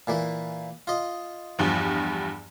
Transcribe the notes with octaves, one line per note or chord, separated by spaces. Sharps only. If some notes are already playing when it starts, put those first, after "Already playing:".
A#2 E3 A#3
F4 D#5
E2 G2 F3